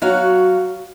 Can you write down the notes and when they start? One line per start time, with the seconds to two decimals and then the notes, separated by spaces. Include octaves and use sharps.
0.02 F#3 F#4 F5